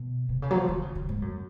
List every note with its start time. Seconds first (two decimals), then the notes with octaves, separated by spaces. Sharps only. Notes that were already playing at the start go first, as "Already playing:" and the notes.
Already playing: B2
0.29 C3
0.42 C#3
0.51 F#3
0.55 F3
0.69 D#3
0.82 C#3
0.95 C#3
1.09 G#2
1.22 F#2